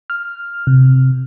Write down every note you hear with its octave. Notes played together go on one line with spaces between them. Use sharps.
F6
C3